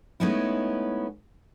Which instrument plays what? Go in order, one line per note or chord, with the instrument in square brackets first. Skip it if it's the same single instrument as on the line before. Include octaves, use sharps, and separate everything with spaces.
[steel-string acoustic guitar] G#3 A3 B3 C#4 D#4 E4